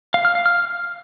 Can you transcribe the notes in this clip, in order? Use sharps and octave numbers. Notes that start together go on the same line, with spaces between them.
F5
F6
F5
F6